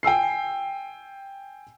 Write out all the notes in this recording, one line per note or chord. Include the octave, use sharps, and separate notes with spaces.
G5 G#5 E6 C7